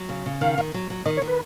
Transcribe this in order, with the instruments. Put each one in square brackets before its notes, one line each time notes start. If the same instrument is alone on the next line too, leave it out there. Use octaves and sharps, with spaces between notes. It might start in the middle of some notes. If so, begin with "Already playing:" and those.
Already playing: [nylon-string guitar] F#3
C#3
C#3
[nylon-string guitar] D#3 [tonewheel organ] F5
[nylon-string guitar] D#3
F#3
F#3
[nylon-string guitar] D#3 [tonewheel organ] D#5
[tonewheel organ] C#5
[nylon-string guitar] D#3
[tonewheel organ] B4